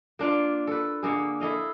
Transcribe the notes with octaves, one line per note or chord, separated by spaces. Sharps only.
A#3 D4 F4
A4 B4
D3 A#3 G#4
E4 A4 D#5 F5